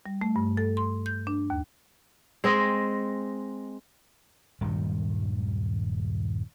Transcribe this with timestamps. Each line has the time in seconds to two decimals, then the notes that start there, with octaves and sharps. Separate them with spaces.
0.06 G3
0.21 A3
0.36 G2
0.57 A4
0.77 C6
1.06 G6
1.27 D4
1.50 D#2
2.44 G#3 C4 D#5
4.61 D#1 G2 D#3 F#3